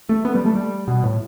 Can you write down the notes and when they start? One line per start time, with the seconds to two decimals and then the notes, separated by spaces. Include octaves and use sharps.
0.09 A3
0.25 B3
0.35 G3
0.46 A3
0.55 G3
0.88 B2
1.03 A2